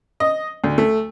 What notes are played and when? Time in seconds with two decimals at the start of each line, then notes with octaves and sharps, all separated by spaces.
0.20 D#5
0.64 D2
0.78 A3